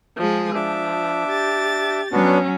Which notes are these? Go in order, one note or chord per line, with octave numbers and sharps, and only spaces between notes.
F3 G#3 G#4
F3 D4 E5 D6
G4 A6
F#3 B3 C#4 D4 F#4